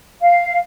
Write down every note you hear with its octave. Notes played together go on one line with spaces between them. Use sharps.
F5